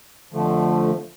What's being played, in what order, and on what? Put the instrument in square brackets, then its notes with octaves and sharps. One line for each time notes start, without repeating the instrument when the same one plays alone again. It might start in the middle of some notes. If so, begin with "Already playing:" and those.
[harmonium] F2 D3 F3 A3